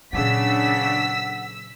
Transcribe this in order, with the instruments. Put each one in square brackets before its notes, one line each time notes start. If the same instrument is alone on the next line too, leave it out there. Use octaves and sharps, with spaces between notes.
[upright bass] A#2 F#3 [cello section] C#3 D4 [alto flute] F#5 [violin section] E6 B6